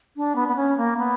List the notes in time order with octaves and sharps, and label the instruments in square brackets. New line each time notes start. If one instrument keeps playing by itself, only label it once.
[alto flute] D4
B3
B3
C#4
A#3
B3